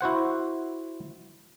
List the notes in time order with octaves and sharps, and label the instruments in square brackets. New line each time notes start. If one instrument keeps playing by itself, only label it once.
[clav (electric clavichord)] E4 F#4 C5 F#5